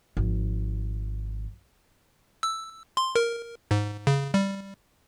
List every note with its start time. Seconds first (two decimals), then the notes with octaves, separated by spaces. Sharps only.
0.17 G#1 F3
2.43 E6
2.97 C6
3.15 A#4
3.71 G#2
4.07 C#3
4.34 G3